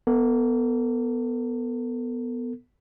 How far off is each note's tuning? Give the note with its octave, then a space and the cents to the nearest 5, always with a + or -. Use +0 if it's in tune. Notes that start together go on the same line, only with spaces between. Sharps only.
B3 +0 A4 +35